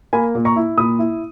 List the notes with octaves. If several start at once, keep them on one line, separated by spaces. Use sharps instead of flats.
A#3 G#5 B5
A#2
A#5 C#6
E4
A#2 B5 D#6
E4